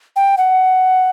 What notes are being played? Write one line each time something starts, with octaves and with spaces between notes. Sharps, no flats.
G5
F#5